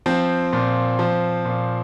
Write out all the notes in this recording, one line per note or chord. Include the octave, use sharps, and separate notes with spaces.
F3 C4
A#2
F3
A#2